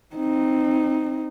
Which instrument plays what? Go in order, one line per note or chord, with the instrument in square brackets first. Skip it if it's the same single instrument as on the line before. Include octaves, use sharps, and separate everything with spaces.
[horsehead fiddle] C4 D#4